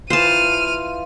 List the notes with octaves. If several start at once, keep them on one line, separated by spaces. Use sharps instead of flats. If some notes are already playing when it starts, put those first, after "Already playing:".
E3 F4 C5 A5 F6 D#7